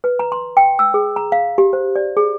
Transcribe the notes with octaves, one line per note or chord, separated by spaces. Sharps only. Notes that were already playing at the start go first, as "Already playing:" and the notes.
B4
A#5
C6
G5
E6
G#4
A#5
F5
G4
C5
D5
G#4